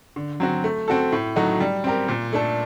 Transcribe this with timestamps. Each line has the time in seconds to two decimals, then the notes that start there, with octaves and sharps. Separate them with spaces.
0.16 D3
0.40 F#3 C4 F#4
0.64 A3
0.88 C4 F#4 A4
1.12 A2
1.36 F#3 A3 D#4 F#4
1.60 G3
1.84 C4 G4 A#4
2.08 A#2
2.33 A3 D4 A4